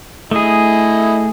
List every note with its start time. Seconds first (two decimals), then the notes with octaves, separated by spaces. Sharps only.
0.31 A3 E4 G#4 D#5